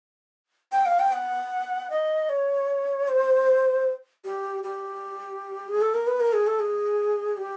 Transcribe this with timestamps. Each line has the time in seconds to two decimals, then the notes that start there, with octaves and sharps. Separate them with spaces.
0.72 G5
0.86 F5
0.99 G5
1.12 F#5
1.90 D#5
2.29 C#5
3.08 C5
4.25 G4
4.63 G4
5.68 G#4
5.81 A4
5.94 A#4
6.07 B4
6.20 A#4
6.33 G#4
6.47 A4
6.59 G#4
7.37 G4